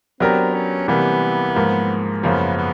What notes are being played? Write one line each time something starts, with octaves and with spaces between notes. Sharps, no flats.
F#3 B3 C4 D4 G4 A#4
C#4
C3 E3 G3 A#3 B3
G#2 F3 A#3
F#2 C#3 F3 A#3 B3
B3